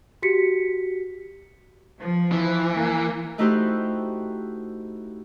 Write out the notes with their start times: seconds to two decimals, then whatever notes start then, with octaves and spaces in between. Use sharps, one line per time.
0.22 F#4 G4 B6 C#7
2.00 F3
2.32 E3
2.76 A#3
3.38 A3 D#4 E4 F#4 G4 C5